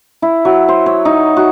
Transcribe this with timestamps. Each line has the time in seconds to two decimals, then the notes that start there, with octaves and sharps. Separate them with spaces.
0.22 E4
0.45 F#3
0.69 C5
0.86 C#5
1.05 D#4
1.37 F#4